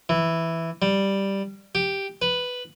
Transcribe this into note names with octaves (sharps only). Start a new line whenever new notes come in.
E3
G3
G4
B4